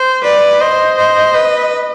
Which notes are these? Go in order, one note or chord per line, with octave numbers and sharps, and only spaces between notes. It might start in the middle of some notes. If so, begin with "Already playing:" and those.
Already playing: C5
B4 D5
C5 D#5
C5
B4